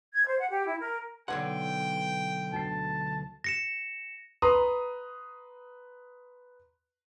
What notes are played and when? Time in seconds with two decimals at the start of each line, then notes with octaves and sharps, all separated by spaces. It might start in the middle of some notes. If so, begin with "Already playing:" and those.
0.13 G#6
0.27 C5
0.38 F#5
0.50 G4
0.66 E4
0.80 A#4
1.28 B1 D3 F#5 G5 C6 G#6
2.53 D2 A5 C7
3.44 A#6 C#7 E7
4.42 B4 A#5 C6 D#6